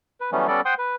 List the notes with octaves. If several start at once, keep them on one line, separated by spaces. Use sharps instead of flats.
B4
E3 F#3 G3 A3 B3 C#4
G3 B3 C#4 A4 D5
C5 F#5 G5 C6 D#6
B4